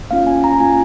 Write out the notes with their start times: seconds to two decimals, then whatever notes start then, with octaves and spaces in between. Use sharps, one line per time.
0.11 A#3 C#4 F4 F5
0.27 G#5
0.44 A#5
0.60 A#3 C#4 F4 G#5